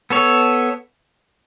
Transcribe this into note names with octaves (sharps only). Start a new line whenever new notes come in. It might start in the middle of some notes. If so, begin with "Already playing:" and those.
B3 A4 C#5